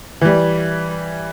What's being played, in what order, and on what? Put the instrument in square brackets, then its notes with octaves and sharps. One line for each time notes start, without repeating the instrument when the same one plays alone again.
[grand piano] E3 G3